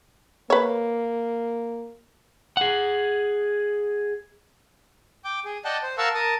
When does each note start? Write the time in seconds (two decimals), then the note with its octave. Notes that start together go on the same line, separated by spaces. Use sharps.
0.50 A#3 B4 C#5
2.57 G#4 F#5
5.25 G5 D6
5.45 G#4
5.65 D5 D#5 F#5 G5 A5
5.83 C5
5.98 A#4 F5 F#5 A5 C#6 E6
6.14 A#4 A5 D#6